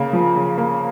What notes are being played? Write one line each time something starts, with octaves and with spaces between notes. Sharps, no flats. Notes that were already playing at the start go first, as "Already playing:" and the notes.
Already playing: C#3 A#3
F3
C#3
A#3